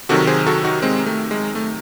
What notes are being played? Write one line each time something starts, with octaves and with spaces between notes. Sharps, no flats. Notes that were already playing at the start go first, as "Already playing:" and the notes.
C3 D#3 F#3 F#4 A4
G#4 C5
F#4 A4
D#4 F#4
G#3 C4
A3
G#3
A3